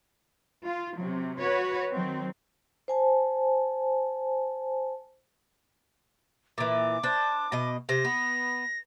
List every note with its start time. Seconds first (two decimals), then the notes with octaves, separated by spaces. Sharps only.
0.65 F4
0.98 C3 F#3
1.40 F#4 B4 C#5
1.92 D#3 F#3 C4
2.88 C5 G#5 A5
6.58 A#2 E3 D6
7.03 D4 C5
7.52 B2 D#5
7.89 C3 C5 A#6
8.05 B3